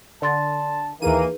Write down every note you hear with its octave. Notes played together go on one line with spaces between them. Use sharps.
D3 D5 A5 C6 A6
D#2 E3 A#3 D#4 G#4 A#4 B4 D#7